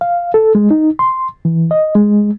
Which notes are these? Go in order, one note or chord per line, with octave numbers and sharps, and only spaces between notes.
F5
A4
G#3
D#4
C6
E3
D#5
G#3